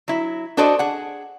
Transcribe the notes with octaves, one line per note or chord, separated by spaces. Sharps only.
F#3 E4
D4 F#4 A4 C5 D5 D#5
G#4 F#5